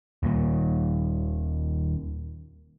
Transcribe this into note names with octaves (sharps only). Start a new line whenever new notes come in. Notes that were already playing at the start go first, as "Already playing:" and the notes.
D#1 D#2 A#2